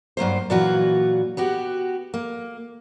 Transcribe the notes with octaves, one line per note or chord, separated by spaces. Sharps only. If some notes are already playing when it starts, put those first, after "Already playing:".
G2 F#3 A#3 C5
A#2 E3 F#3 F4 F#4
B3 F#4 G4
A#3